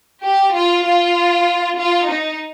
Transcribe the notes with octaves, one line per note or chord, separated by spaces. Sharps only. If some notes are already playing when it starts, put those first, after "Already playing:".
G4
F4
F4
F4
D#4